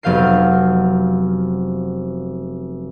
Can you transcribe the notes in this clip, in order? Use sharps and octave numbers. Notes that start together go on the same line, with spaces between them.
F1 F#3 B3 F5 G6 C7